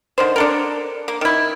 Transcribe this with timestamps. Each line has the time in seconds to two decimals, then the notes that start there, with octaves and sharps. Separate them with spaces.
0.18 D3 D#3 C5
0.36 D4 A4 A#4
1.08 A#3
1.21 D#3 E4